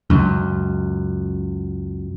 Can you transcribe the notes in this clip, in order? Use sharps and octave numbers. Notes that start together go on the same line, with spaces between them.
C#2 F#2